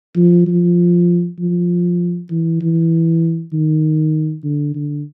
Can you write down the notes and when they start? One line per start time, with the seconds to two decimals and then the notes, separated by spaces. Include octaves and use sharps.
0.16 F3
0.47 F3
1.39 F3
2.31 E3
2.62 E3
3.53 D#3
4.44 D3
4.75 D3